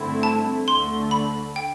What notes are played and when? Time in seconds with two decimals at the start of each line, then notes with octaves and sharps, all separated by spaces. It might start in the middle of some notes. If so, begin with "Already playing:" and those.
Already playing: G2 D3 A3 C4 E4
0.23 A5
0.68 D2 D3 A3 C6
1.11 B5
1.56 G5